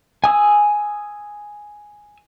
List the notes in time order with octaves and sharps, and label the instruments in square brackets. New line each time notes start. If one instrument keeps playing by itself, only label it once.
[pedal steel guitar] G#5 D#6 E6